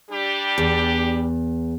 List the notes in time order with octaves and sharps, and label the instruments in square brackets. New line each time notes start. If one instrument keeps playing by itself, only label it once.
[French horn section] G3 D4 G4
[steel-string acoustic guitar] E2